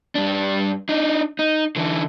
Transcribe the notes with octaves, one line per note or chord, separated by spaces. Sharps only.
G2 D4
D4 D#4
D#4
D3 E3